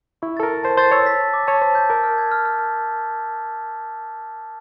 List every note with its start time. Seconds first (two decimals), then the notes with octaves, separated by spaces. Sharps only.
0.22 E4 C#6
0.37 A4 A6
0.43 A#4
0.50 A5
0.63 C5 A5
0.78 C5 A6
0.92 C#5 E6
1.06 B6
1.20 A5
1.34 D6
1.47 C#5 A5
1.62 C5 B6
1.75 G6
1.90 A#4 D6
2.03 F6
2.18 G#6
2.31 F6
2.45 F6
2.59 F6